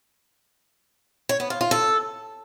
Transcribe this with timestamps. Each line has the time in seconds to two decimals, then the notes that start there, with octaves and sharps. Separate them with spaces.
1.29 C#5
1.40 B3
1.50 F4
1.61 F4
1.71 A4